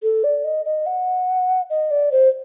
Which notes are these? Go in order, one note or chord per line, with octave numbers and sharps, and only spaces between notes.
A4
D5
D#5
D#5
F#5
D#5
D5
C5